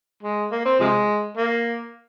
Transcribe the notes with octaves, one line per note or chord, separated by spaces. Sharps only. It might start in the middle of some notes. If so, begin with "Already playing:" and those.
G#3
A#3
C4
C3 F3 G#3
A#3